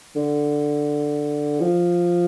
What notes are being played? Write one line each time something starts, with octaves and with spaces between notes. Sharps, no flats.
D3
F3